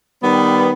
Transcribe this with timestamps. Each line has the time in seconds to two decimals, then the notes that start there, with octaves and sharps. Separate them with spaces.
0.23 D#3 G3 B3